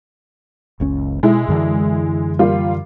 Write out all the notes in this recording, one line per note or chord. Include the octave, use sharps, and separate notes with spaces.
F#1 C#2 C#4
B2 G#3 E4
F#2 D3 E3
G3 A#3 F4